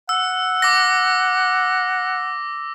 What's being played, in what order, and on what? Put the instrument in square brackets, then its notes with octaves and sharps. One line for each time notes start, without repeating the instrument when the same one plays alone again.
[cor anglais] F#5 [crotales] E6
[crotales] D6 A#6